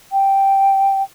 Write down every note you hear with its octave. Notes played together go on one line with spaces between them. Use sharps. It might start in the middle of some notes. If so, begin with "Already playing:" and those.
G5